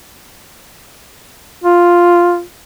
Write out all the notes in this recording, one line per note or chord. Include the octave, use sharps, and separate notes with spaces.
F4